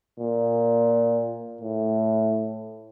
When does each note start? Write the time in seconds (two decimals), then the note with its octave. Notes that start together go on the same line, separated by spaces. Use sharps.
0.20 A#2
1.61 A2